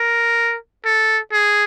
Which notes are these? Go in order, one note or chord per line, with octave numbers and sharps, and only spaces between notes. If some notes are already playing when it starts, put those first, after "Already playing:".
Already playing: A#4
A4
G#4